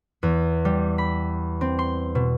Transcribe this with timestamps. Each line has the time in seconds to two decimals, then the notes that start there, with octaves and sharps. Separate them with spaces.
0.23 E2
0.65 G3
0.98 B5
1.61 C4
1.79 C6
2.15 B2